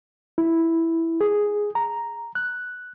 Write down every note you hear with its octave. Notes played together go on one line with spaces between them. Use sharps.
E4
G#4
A#5
F#6